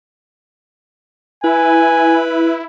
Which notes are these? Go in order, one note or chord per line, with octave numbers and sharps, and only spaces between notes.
E4 B4 G#5